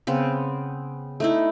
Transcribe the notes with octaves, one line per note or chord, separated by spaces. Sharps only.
C#3 B3 C4
A3 D#4 E4